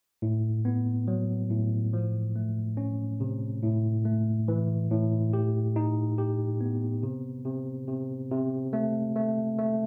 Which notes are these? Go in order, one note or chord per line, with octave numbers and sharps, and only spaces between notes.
A2
B3
F#3
A2
F3
A3
C#4
C3
A2
A3
E3
A2
G4
D#4
G4
B3
C3
C3
C3
C3
A3
A3
A3